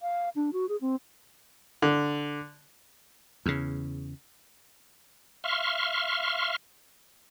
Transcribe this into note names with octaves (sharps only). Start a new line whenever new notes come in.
F5
D4
F#4
G#4
C4
D3
E2 C#3
E5 F5 C6 C#6 F6